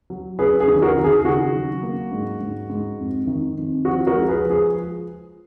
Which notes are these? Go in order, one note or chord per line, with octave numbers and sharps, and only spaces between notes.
F#3
C#4 G#4 B4
G#4
D#3
F#4 A#4
D#3
G#4
G#4
C#3 F#4
F#3
A#3
G#2
G#2
G#2
F2
D#3
F2
F3 F#4
F#4 A#4
G#3
G#4 B4
F3
G#4